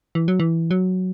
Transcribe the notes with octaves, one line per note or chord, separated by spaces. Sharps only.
E3
F#3
E3
F#3